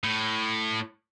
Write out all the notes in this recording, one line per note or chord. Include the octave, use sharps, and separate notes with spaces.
A2